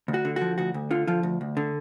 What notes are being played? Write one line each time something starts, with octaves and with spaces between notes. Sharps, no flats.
D2
F#4
D3
F#4
F3
D2 F#4
D2
D3 F4
F3 F4
D2
D2
D3